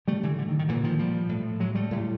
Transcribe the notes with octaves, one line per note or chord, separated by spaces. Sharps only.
A2 G3 A3
D3 E3
D3
D#3
D#3
A#2 D3 E3
D#3 F3
F3 G3
A2
F#3 G#3
G3 A3
A2